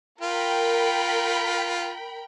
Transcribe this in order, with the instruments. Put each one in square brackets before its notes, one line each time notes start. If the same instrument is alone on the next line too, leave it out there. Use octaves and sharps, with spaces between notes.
[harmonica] F4 [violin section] A#4 G5 B5